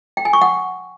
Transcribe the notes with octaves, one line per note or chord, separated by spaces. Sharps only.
G5
G#5
C#6
F#5